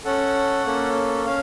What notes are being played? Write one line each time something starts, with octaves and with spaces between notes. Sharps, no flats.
C#4 A4 F#5
A#3 C#4 A4
C#4 F5